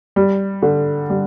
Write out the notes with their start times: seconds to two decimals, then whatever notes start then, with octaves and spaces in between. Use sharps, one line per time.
0.16 G3
0.63 D3
1.10 G3